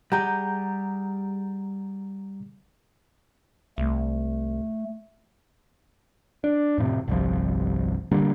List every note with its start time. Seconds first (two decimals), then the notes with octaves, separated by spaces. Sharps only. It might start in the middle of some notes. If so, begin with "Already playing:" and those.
0.12 G3 G4 G#4 F#5 A#5 G6
3.78 C2 A3
6.44 D4
6.78 F2 A2 C3
7.08 G1 C2 F3
8.11 D3 G3 A#3